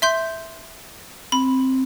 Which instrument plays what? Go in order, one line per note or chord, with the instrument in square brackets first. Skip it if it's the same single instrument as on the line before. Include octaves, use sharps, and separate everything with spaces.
[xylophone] E5 C6 G6
[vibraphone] C4 [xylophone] B5